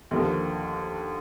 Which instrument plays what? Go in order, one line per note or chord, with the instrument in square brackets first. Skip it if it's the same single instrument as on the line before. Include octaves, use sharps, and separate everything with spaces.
[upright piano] D#2 D3 F3 A#3